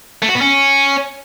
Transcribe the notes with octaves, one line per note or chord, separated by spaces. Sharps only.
A3
F#4
B3
C#4